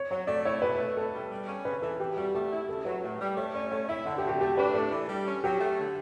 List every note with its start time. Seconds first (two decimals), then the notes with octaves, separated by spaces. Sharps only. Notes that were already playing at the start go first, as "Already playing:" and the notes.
Already playing: C#5
0.11 F#3 C#5
0.27 A3 D5
0.45 E4 C#5
0.62 B2 B4
0.79 A3
0.96 B2 A4
1.13 G3
1.30 G3
1.48 C#4
1.65 C#3 B4
1.82 E3 A4
2.00 E3 G4
2.17 G3 F#4
2.34 A3 G4
2.51 E4
2.68 C#3 A4
2.85 F#3 B4
3.03 A2
3.20 G3
3.37 A3 C#5
3.54 C#4 D5
3.71 A3 C#5
3.89 E4 E5
4.06 D3 F#5
4.18 G4
4.24 F#3
4.29 G4
4.41 A3 G4
4.58 D4 B4
4.74 A2 A4
4.91 E3
5.09 G3
5.26 C#4
5.44 F#3 G4
5.60 A3
5.78 D3